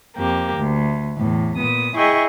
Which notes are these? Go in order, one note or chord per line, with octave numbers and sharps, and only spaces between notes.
F2 A#3 G4
D2
E2 A2
A#2 B3 D#6
E4 G#4 D#5 E5 G5 C#6